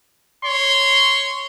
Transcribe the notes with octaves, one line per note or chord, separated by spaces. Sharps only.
C#5 C6